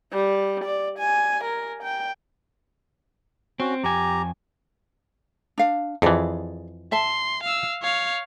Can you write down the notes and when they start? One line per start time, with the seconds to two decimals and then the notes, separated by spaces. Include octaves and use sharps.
0.12 G3
0.64 D5
0.99 G#5
1.44 A#4
1.83 G5
3.60 C4 C#4 F#4
3.84 F2 G4 G#5 A#5
5.58 D4 F5
6.02 F2 E3 G#4 D5
6.92 E5 A5 C6
7.43 F5 E6
7.83 C#5 F5